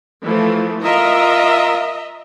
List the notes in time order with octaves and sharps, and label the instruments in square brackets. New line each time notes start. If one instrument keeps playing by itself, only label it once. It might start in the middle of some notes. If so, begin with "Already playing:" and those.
[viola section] E3 F3 A3
[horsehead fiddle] F4 A#4 [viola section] D#5 E5 A#5